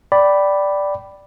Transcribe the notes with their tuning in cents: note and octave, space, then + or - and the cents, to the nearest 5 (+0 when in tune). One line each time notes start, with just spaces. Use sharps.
D5 +0 G5 -20 B5 +0